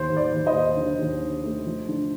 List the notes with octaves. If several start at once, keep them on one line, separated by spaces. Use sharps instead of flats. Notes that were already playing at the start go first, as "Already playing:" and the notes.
Already playing: D#2 C5
D#2
D5
D#2
C5 D#5
D#2
D3
D#2
D3
A3
F3
D3